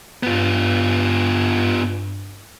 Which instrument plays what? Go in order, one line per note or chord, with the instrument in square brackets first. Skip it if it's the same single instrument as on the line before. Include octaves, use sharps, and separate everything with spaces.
[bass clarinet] G2 [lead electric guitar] B3 F4